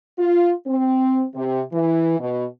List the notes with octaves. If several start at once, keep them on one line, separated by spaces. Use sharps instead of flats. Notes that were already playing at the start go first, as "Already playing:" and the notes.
F4
C4
C3
E3
B2